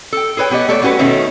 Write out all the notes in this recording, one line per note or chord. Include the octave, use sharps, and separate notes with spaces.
A4 G5
G#4 A4 B4 C#5 G5
B2 B3 G4 C#5 D#5
A3 A4 C#5 D5
A3 C#4 F#4 G4 B4
B2 D#3 A3 C#4